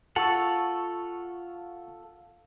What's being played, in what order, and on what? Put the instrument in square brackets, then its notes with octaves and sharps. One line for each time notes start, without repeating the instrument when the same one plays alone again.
[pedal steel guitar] F4 A4 F#5 [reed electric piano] A5 C#6 E6